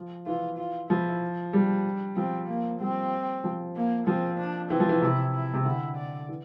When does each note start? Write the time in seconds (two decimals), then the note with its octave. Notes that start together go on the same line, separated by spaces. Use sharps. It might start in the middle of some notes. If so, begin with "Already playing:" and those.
Already playing: F3
0.26 E3 F4
0.58 F4
0.90 F3 E4
1.53 G3 D4
2.16 F3 C4
2.48 A#3
2.80 G3 C4
3.44 F3
3.76 A#3
4.07 F3 C4
4.38 D4
4.70 E3 C4
4.80 F3
4.89 E3
5.02 C3 E4
5.34 E4
5.54 C3
5.65 D3 E4
5.97 D5
6.29 E3